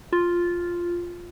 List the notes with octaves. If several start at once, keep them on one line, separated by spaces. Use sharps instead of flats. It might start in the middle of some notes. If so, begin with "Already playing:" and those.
F4